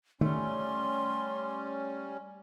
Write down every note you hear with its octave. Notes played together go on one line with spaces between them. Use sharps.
D#3 G3 A3 C#4 C6